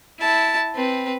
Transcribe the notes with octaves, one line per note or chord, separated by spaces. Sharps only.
E4 A5
C4 B4